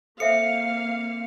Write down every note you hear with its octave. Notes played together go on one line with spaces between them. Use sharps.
A#3 C4 A4 C5 E5 F5 C#7